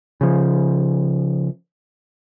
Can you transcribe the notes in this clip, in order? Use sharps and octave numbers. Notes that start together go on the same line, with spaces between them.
C#3 F3